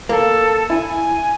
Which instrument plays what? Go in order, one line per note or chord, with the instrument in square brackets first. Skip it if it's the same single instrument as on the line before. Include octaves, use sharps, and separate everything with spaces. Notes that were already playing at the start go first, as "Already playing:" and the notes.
[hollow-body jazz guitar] A#3 [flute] A4
[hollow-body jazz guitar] E4 [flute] G#5